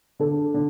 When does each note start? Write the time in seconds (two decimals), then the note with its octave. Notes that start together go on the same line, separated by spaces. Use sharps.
0.19 D3 A4
0.54 D3